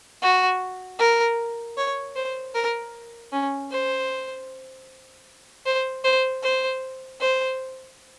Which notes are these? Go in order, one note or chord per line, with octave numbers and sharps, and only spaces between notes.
F#4
A#4
C#5
C5
A#4
C#4
C5
C5
C5
C5
C5